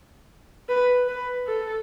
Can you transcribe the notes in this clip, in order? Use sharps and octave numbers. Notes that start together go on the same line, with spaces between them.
B4
B4
A4